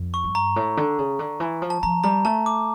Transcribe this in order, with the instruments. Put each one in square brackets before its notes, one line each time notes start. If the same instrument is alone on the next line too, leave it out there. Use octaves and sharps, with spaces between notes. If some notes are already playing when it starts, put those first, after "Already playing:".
Already playing: [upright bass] F2
[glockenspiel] C#6
[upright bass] G2
[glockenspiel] A#5
[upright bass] A2
D3
C#3
D3
E3
F3
[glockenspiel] A5
[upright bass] F3 [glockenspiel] A#5
[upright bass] G3 [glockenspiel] A#5
[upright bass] A3 [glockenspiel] A5
[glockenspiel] D6